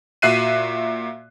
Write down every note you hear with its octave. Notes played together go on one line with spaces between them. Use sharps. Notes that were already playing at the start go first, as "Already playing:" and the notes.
A#2 F#4 E5 F#6 C7 D#7